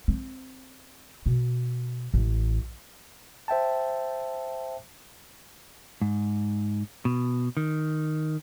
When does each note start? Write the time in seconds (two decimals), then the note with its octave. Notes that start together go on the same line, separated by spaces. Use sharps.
0.08 C4
1.26 B2
2.14 A1
3.48 C5 E5 G5 A5
6.02 G#2
7.05 B2
7.57 D#3